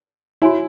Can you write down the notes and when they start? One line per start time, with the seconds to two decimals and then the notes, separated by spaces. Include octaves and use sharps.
0.42 E4 F#4 C#5 G#5 B5